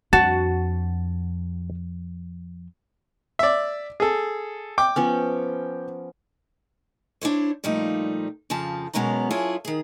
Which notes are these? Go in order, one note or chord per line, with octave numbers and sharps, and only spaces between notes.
F2 F#4 A5
D5 E5
G#4 A4
G5 D6
F3 B3 C#4
D4 E4 C5 C#5
A#2 F3 G3 A3 D#4
F2 C#3 F3 A5
F#2 B2 G#3 B3 C#4 A#5
F#2 E4 F4 G#4 C#5 A5
D#3 G#4